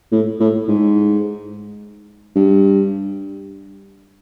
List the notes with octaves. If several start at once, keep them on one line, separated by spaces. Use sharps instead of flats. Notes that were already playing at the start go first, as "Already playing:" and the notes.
A2
A2
G#2
G2